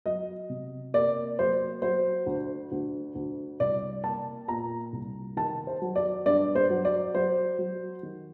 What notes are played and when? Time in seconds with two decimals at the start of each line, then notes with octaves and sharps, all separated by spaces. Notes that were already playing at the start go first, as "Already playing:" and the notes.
0.06 F#3 D#5
0.50 C3
0.94 A#3 D5
1.38 F#3 C5
1.82 F#3 C5
2.26 D2
2.72 D2
3.15 D2
3.60 C2 D5
4.04 A#3 A5
4.48 A#2 A#5
4.93 C2
5.37 D#3 A5
5.67 C5
5.82 F#3
5.96 D5
6.26 G2 D5
6.55 C5
6.70 F#3
6.85 D5
7.15 F#3 C5
7.59 F#3
8.03 D#3